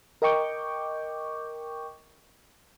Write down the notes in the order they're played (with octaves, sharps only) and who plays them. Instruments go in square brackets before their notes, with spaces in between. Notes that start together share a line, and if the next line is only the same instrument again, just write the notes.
[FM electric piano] A#4 D#5 G5 C#6 D6 G6